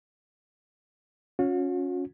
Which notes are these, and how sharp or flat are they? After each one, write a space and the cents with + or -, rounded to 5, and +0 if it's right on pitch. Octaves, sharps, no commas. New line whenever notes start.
C#4 +0 F#4 -45